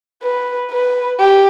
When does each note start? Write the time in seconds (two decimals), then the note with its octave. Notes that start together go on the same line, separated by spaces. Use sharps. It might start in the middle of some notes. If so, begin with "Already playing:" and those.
0.22 B4
0.71 B4
1.19 G4